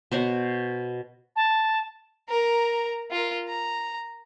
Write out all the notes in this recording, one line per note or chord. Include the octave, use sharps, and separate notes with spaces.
B2 C5 C#5 F#5
A5
A#4 A#5
F4 A#4
A#5